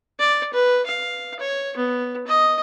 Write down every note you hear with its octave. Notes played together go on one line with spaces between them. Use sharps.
D5
B4
F5
C#5
B3
D#5